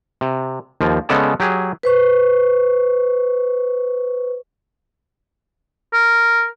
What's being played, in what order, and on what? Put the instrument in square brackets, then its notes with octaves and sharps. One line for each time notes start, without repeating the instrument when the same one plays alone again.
[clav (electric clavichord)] C3
D#2 F3
C#3 G#3 B3 A4 D5 A5
F#3 G4 G#4
[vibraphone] B4 C5 C#6
[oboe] A#4